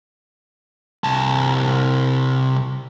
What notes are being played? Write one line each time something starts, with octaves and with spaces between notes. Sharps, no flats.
C2 A5